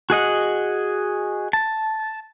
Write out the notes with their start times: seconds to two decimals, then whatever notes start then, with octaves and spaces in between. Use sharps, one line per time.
0.10 F#4 G#4 D#5 F#5
1.53 A5